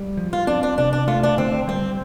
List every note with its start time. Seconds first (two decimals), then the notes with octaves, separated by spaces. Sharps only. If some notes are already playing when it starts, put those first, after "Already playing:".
Already playing: G3
0.17 F3
0.33 F4
0.47 C4 D4
0.63 D4
0.78 C3 D4
0.93 D4
1.08 A3 F4
1.23 D4
1.38 D3 C4
1.68 G3 C4